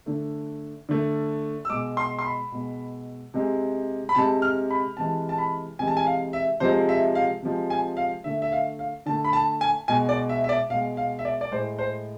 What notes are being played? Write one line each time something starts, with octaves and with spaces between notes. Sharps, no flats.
D3 A3
D3 A3
E6
B2 G#3 D6
C6
C6
B5
B2 G#3
C3 G#3
B5
C3 G#3 A5
F6
B5
C3 E3 G#3 A5
A5
B5
C3 E3 G#3 G#5
A5
G#5
F5
E5
C3 F3 G#3 C5
E5
F5
C3 F3 G#3
G#5
F5
D3 A3 E5
E5
F5
F5
D3 A3 A5
B5
A5
G#5
B2 G#3 G#5
D5
E5
E5
D5
B2 G#3 F5
F5
E5
D5
D5
A2 G#3 C5
C5